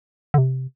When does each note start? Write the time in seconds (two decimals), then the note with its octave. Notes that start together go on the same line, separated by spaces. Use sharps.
0.34 D3
0.38 C3